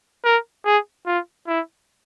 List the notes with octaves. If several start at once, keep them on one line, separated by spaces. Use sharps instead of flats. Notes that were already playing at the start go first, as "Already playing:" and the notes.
A#4
G#4
F4
E4